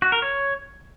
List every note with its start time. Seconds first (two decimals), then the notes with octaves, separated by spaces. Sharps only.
0.02 F#4
0.12 A#4
0.22 C#5